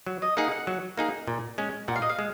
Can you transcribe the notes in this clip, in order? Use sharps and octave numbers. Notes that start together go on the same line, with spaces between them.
F#3
D#5
A#3 D#4 G#4 F#5
F#5
F#3
A#3 D#4 G#4
A#2
G#3 C#4
A#2 F#5
F5
D#5
F5
G#3